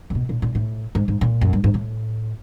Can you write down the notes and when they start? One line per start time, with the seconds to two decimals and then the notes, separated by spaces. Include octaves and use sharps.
0.10 A#2
0.15 B2
0.29 A#2
0.42 A#2
0.55 A2
0.95 G#2
1.08 G#2
1.21 A#2
1.41 F#2
1.53 G2
1.64 G#2
1.74 A2